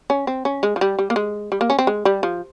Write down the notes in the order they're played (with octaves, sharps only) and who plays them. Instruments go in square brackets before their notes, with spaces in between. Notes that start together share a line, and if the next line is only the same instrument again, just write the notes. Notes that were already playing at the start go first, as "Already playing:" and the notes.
[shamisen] C#4
C4
C#4
G#3
F3
G3
G3
A#3
G#3
G3
A#3
C#4
C4
G#3
G3
F3